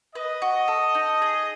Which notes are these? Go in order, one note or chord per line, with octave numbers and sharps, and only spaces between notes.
B4 D#5
F#4
A4
D#4
G#4